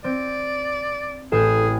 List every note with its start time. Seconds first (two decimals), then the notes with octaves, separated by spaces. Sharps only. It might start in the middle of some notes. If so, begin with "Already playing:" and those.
0.04 C4 D5
1.32 A1 G#4 A4 G5 E7